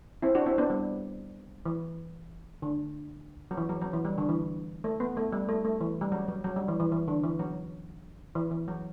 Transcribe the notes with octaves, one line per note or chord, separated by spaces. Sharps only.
C4 E4
D4 F#4
C4 E4
B3 D4
G3
E3
D3
F#3
E3
F#3
F#3
E3
G3
D3
E3
A3
B3
A3
G3
A3
A3
E3
G3
F#3
F#3
F#3
G3
E3
E3
E3
D3
E3
F#3
E3
E3
F#3